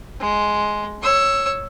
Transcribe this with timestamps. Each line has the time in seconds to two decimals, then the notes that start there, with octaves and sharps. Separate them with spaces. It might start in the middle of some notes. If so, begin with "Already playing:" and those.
0.20 G#3
1.02 C#5 E6